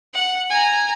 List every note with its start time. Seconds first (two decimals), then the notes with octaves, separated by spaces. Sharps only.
0.14 F#5
0.50 G#5 A#5